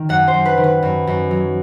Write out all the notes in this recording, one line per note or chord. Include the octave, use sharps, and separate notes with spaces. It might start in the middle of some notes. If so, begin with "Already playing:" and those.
Already playing: D#3
F#2 F#5
C5
F#2
B4
D#3
B4
F#2
F#2
F#3